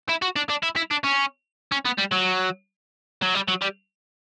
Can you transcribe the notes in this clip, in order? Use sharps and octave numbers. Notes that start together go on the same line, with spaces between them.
E4
F#4
D4
D4
E4
E4
D4
C#4
C#4
B3
G3
F#3
F#3
G3
F#3
G3